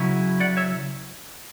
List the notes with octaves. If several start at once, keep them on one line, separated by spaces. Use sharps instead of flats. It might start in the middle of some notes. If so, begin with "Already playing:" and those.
Already playing: C#3 F#3 C#4 E4
D5 F#5
C#5 E5